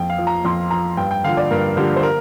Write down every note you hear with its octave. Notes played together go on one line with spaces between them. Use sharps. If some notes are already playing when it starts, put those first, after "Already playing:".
Already playing: F2 G5
F5
F3
A#5
F2 C6
F3 A#5
G2 G5
G5
D3 F3 F5
D5
G2 A#4
D3 F3 G4
C5
A#4